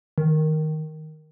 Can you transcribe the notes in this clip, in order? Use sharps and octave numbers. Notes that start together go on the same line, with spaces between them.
D#3